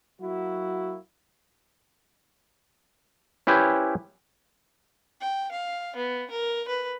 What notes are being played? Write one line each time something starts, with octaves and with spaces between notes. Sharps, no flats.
F#3 A#3 E4 F#4
C#4 E4 G4 B4 C5
G5
F5
B3
A#4
B4